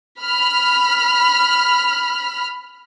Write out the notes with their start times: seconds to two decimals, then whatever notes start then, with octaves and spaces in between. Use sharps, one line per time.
0.20 B5 F6